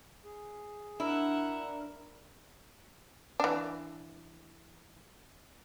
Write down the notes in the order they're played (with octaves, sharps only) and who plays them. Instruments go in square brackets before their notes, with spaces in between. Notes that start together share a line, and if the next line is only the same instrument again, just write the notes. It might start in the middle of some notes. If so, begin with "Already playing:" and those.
[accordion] G#4
[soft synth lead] D4 [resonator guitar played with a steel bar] E4 [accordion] A#4 [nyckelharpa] E5 F#5
[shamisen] E3 D4